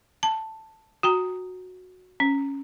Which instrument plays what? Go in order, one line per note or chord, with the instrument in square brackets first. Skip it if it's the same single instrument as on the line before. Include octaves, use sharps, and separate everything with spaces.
[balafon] A5
F#4 G5 A#5
C#4